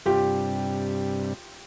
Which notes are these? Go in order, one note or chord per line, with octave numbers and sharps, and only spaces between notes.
G2 C3 G3 F4 G4